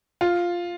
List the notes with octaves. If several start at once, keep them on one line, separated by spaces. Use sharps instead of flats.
F4